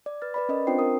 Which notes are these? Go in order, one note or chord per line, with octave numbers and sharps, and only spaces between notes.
D5
B4 F6 A6
B4 D5 B5
C#4 A#4 D#5
C4 D4 F4 C5 G5 C7
A#4 D#6